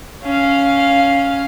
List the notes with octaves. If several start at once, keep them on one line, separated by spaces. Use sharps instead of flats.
C#4 F5